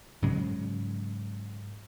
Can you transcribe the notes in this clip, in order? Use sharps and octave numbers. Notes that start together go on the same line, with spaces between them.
G#2 C#3 F#3 G#3